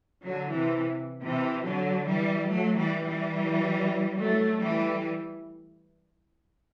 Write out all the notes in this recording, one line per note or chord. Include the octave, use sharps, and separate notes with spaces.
D3 F#3
C3 E3
C3 E3
D3 F#3
E3 G3
F#3 A3
E3 G3
E3 G3
F#3 A3
E3 G3